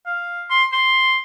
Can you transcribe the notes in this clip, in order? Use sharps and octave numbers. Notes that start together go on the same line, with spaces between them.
F5
C6
C6